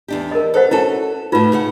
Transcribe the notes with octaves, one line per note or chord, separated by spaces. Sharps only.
E2 D4 G4
A#4 D#5
A4 B4 C5 F#5
C#4 E4 F#4 A4 A5
A2 D#4 F4 F#4 B4
C#3 G#4 F#5